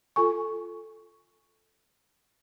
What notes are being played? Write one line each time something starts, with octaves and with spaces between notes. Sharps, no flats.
F4 A4 G#5 C#6